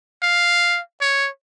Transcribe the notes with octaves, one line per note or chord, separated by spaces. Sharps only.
F5
C#5